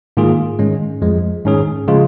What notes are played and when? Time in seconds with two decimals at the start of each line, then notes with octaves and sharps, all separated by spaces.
0.17 G#2 D#3 A#3 F4 G#4
0.59 G#2 D#3 G#3 C#4
1.02 F2 F3 G#3
1.45 G#2 D#3 C#4 G#4
1.88 C#3 F3 G#3 F4